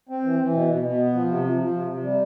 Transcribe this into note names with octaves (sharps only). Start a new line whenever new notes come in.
C4
E3
E3
B2
B2
B2
B3
F3
C3
F3
F3
C3
C3
G3